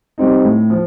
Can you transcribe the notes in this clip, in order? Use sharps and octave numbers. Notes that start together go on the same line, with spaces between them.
G3 C4 D#4
A2
F3